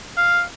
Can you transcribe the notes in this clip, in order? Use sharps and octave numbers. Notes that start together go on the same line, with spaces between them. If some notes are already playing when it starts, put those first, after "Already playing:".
F5